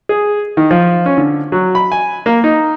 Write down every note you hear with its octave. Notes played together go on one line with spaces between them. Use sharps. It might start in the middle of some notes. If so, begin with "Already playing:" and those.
G#4
D#3
F3
C#4
D3
F#3
B5
G#5
A#3
D#4